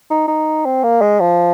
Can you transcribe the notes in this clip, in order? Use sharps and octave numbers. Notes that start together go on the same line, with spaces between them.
D#4
D#4
C4
A#3
G#3
F3